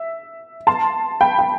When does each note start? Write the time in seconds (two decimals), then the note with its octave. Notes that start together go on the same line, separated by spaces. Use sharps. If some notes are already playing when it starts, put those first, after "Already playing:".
Already playing: E5
0.67 A5 C6
1.21 G5 B5
1.39 G5